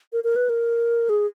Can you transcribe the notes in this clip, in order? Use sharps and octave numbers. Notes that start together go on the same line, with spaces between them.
A#4
A#4
B4
A#4
G#4